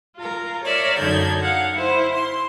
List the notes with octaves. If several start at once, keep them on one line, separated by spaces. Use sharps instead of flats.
F4 A#4
A#4 C#5 D5 E5
F#2 D3 D#4 G6 G#6
F5 F#5
E4 C5
C6